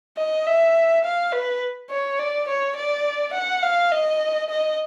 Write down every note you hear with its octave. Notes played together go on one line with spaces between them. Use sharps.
D#5
E5
F5
B4
C#5
D5
C#5
D5
F#5
F5
D#5
D#5